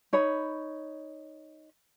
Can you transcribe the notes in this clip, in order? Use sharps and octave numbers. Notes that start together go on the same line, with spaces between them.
D#4 C#5 B5